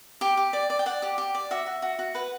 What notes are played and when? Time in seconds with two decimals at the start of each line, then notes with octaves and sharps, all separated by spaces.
0.21 G4 G5
0.37 G4
0.53 D5
0.70 D5
0.79 G5
0.86 D5 F#5
1.02 G4
1.18 G4
1.35 D5
1.51 F#4 E5
1.66 F#4
1.82 F#4
1.99 F#4
2.15 B4 F#5